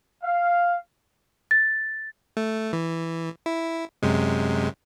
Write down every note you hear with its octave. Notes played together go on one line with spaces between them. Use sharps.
F5
A6
A3
E3
E4
F#2 C3 G#3